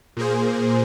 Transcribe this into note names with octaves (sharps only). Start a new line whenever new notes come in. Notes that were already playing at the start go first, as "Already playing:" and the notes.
A#2 A#3 G#4 C5